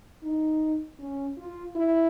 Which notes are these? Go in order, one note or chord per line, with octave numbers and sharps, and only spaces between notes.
D#4
C#4
F4
E4